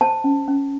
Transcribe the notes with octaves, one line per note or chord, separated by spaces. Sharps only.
C5 A5
C#4
C#4